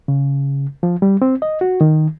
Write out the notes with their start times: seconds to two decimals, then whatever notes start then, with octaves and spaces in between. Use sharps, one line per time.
0.08 C#3
0.83 F3
1.02 G3
1.22 C4
1.42 D#5
1.61 F#4
1.81 D#3